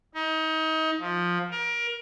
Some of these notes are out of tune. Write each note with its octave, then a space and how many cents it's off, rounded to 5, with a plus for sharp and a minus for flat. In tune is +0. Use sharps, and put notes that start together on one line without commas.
D#4 +30
F3 +10
A#4 +25